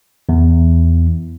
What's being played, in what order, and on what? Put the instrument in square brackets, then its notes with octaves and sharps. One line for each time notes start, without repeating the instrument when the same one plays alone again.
[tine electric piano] E2